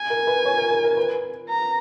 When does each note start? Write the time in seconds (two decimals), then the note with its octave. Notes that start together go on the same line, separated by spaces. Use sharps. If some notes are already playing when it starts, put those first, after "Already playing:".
Already playing: G#5
0.10 A#4
0.27 B4
0.45 C#5
0.58 A#4
0.70 A#4
0.84 A#4
0.97 B4
1.49 A#5